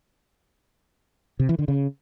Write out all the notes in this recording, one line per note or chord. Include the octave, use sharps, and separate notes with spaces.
C3
E3
D3
C#3